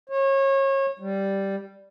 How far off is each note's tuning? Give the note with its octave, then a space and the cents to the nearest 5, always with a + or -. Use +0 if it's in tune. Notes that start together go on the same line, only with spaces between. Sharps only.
C#5 -30
G3 -5